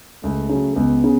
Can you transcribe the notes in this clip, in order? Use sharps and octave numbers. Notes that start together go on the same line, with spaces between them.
C#2 A3
C#3 F#3
C#2 B3
C#3